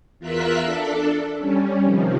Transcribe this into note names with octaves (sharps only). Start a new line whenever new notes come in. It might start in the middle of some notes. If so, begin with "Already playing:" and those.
E2 F4 A#4 E5 F#6 B6
D4 A4
G3 C#4
C3 D#3 F3